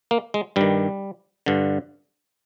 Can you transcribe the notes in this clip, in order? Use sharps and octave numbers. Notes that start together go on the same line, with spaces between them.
A#3
G#3
G2 D#3 G3
G2 D3